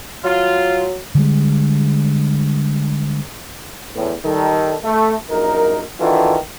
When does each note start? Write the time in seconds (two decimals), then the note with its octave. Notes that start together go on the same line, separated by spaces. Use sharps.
0.24 F#3 F4
1.15 D3 G3 G#3
3.95 E2 A2
4.24 D#3 G3 A4
4.84 A3
5.30 A#1 F#2 D#4 A#4
6.00 D#3 E3 D4 F4 F#4 A4